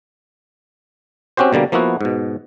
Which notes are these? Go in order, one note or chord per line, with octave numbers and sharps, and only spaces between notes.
C4 C#4 F#4 G4 C5
B2 D3 G3 A#3
F3 A#3 B3 E4 F#4
G#2 B2